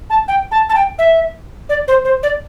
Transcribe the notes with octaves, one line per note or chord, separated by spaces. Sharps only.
A5
G5
A5
A5
G5
E5
D5
C5
C5
D5